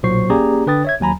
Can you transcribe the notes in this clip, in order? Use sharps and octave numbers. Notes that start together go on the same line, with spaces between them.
B1 A#2 F#3 C5 C#6 C7
A#3 C#4 G4 G#4 D5 A#5
D3 D4 B4 G5 D#6 A6
C#5 E5 G#6
D#2 F#3 G#5 A#5 B5